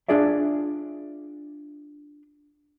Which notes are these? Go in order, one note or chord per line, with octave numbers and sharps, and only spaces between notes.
D4 F4 G#4 D5 E5